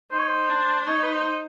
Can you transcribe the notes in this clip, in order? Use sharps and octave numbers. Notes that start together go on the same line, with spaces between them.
D#4 C5
C#5
C5
D4
D#4 C#5
B4
C5